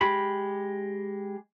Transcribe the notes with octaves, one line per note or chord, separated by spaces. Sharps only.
G#3 G4 B5